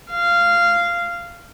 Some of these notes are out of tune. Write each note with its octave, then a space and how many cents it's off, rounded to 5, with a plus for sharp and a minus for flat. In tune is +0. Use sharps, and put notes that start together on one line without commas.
F5 -15